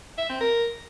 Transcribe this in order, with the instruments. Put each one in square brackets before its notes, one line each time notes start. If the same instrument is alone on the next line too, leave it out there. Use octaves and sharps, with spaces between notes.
[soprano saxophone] E5
C4
A#4